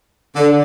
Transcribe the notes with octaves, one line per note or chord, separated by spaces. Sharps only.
D3